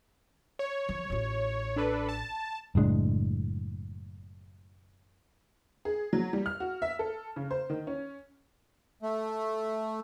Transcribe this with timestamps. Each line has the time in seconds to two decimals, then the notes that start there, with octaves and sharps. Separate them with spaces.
0.59 C#5
0.89 F3
1.10 A1 F4
1.76 D4 A4 B4
2.09 A5
2.75 F#1 A2 G#3 D4
5.85 G#4
6.13 F#3
6.33 G3
6.46 F6
6.60 F#4
6.82 E5
6.99 A4
7.36 C#3
7.51 C5
7.70 D#3
7.87 C#4
9.03 A3